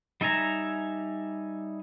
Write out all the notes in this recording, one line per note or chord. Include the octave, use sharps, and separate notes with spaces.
G3 D#4 E5 G#5 A#5